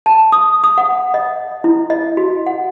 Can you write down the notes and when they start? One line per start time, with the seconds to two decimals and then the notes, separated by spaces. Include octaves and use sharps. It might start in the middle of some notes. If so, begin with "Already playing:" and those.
0.06 A5
0.32 D#6
0.64 D#6
0.78 F#5
1.14 D#5
1.64 E4
1.90 D#5
2.17 F#4
2.47 F#5